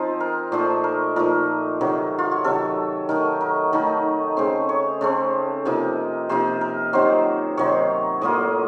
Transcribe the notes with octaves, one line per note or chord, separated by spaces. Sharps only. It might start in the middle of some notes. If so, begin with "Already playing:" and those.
Already playing: F3 C4 D#4 F4
A#4
A#2 F3 A3 D#4 C5
A#4
A#2 F3 A3 D#4 A#4
C3 D#3 F#3
F4
F#4
C3 D#3 F#3 A4
D#3 A3 D#4 A#4
A#4
D#3 A3 D#4
C#3 A3 C4
C#5
C#3 A3 C4
C3 F3 A#3 D#4
C3 F3 A#3 D#4 C5
A#4
C3 D#3 F#3 C4 C5
C3 D#3 F#3 C4 C#5
A2 F#3 A#3 F4 D#5